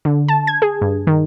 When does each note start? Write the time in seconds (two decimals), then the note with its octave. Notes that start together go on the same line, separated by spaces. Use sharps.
0.05 D3
0.28 A5
0.47 G#6
0.62 G#4
0.82 G2
1.07 D#3